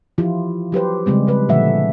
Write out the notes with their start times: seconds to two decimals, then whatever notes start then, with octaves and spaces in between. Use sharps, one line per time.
0.18 E3 F3 E4 F4 G4
0.72 F#3 G4 B4 C5
1.06 C#3 G3 G#3 C4
1.27 C#3 G#3 B4
1.49 A#2 D3 F3 A3 E5 F#5